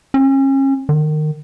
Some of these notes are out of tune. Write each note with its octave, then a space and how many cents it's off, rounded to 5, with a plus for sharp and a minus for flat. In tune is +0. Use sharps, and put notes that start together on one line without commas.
C#4 -35
D#3 -25